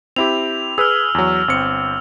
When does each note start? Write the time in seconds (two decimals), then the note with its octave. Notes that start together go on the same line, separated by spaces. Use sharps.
0.16 C4 E4 G4 F7
0.78 G#4 B4 E6 F6
1.15 E2 F#3
1.48 G1 C4 C#7